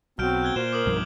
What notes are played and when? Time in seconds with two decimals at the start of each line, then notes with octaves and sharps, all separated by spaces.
0.19 B1 C4 F#4 F6 G6 D7
0.44 F#6 G#6 G7
0.56 A#2 C5 E7
0.73 A#4 D6 D#6 F#7
0.86 B1 G2 F3